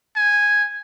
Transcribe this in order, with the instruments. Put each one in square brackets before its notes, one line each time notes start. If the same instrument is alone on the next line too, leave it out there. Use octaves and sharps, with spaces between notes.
[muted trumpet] G#5